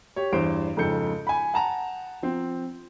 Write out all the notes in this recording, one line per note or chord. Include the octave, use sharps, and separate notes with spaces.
G4 C#5
E2 G2 C5 C6 D7
F2 G#2 C#3 A4 G6 C#7
G#5 B5
F#5 A5 A#5
F3 C4